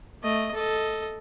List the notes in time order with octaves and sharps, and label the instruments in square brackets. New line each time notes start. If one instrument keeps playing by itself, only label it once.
[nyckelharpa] A3 D#5
A4 D#5